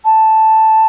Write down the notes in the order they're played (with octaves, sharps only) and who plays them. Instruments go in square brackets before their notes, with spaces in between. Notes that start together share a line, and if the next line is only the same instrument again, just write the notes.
[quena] A5